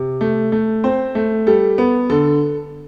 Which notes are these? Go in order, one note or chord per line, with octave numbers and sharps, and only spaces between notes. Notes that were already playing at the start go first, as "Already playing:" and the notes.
Already playing: C3
A3
A3
C4 C5
A3
G3 A4
B3
D3 A4